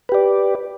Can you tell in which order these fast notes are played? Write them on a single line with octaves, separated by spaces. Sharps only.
B4 G4 D5